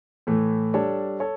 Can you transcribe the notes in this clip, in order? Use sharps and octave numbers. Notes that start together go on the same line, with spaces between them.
A2 E3 A3
G3 D4 A4 C#5
A4 C#5